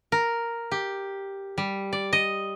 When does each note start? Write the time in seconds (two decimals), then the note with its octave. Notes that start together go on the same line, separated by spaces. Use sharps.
0.12 A#4
0.72 G4
1.58 G3
1.93 D5
2.13 D#5